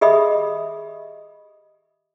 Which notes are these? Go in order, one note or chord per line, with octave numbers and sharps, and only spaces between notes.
G4 G#4 D#5 E5 B5 D#6